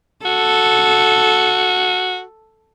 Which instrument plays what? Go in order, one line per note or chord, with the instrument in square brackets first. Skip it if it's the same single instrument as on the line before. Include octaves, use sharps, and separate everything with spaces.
[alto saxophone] F#4 [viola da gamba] A4